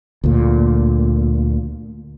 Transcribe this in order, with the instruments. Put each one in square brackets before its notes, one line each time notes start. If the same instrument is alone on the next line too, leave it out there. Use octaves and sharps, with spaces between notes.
[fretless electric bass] D2 A#2